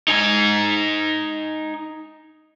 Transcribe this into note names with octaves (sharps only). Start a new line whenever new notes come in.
D#4 G#5